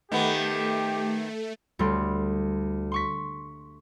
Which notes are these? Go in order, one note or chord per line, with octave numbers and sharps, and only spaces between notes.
D#3 A3 B3 G4
D2 G3 D4 C6
C6 C#6 B6